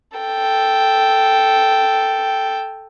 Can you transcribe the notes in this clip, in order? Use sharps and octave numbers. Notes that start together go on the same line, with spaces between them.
A4 G5